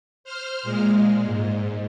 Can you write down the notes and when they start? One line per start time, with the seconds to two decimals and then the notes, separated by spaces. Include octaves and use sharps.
0.24 C5 F6
0.63 A#2 G#3
1.25 G#2